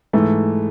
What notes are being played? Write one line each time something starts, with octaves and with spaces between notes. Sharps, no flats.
G#2 E3 A3